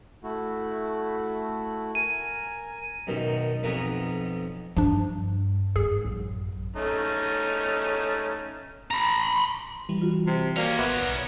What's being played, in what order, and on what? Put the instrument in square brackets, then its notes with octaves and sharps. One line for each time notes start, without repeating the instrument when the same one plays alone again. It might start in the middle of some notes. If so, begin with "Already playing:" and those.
[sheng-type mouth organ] A3 E4 F#4
[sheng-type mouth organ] A#4 G#5 [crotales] D#7
[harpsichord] F#2 B2 D#3
B1 F2 B3 E4 D#5 A#5
[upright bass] G2 [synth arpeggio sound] F3 D4
[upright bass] G#2 [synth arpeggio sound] G#4
[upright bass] A1 F#2
[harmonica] A3 C#4 D#4
[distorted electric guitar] A#5 B5
[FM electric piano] E3 G3
[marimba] F4 F#4
[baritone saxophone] C3
[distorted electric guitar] D#3 C#4 [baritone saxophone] A#3 [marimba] F#4 D5
[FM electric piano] A1 [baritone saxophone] B3 [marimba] E5 C6 D6
[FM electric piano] B1